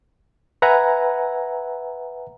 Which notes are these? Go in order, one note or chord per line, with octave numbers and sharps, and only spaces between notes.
B4 E5 F#5 G#5 A#5